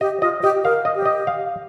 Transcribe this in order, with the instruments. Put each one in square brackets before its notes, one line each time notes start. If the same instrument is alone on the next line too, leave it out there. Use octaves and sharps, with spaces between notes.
[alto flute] G4 [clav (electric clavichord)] D#5
[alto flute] F4 [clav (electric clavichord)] D#5
[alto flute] G4 [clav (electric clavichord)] D#5
[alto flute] A#4 [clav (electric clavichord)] F5
[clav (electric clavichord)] D#5
[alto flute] G4
[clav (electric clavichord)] D#5
F5